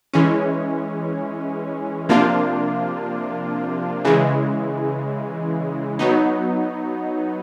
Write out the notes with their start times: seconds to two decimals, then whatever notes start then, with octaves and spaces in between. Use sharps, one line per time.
0.13 E3 G#3 C#4
2.09 C3 F3 A#3 D4 F4
4.05 C#3 E3 G#3
5.99 F#3 B3 D#4